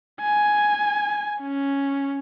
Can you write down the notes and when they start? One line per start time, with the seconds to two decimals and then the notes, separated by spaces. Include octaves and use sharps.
0.20 G#5
1.41 C#4